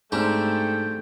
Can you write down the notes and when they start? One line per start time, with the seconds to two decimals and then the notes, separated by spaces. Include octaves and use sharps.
0.12 G#2 A3 C4 D4 G4 G5